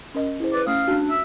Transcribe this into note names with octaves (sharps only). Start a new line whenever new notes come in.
C#4 A#4 D#5
E4 G#4 C5
B4 D5
A3 C#4 F5 D#6
D4 F#4
E5